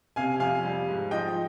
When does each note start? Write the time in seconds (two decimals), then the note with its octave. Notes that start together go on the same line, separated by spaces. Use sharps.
0.16 C3 F5 G#5
0.40 F2 F5 G#5
0.64 G3
0.88 G#2
1.11 F3 D#5 G5